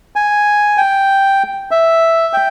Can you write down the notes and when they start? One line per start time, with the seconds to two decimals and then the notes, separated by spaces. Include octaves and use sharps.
0.16 G#5
0.78 G5
1.71 E5
2.33 G5